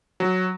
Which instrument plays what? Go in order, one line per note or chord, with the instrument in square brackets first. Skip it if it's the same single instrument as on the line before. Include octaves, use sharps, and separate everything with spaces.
[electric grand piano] F#3